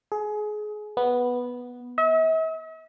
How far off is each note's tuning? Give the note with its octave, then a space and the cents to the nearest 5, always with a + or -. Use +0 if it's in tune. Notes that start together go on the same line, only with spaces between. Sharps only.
G#4 +25
B3 -5
E5 -45